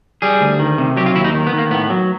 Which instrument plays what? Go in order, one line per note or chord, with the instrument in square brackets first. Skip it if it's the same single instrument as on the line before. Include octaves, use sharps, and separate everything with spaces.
[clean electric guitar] G3 G#4
D2
D#3
C3
F#3 G4
F4
D#2 E4
D#4
D#3
B3
D#3
A#3
A2 B3
F#3